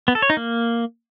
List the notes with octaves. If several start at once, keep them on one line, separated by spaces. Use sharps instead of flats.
B3
A4
C#5
D#4
A#3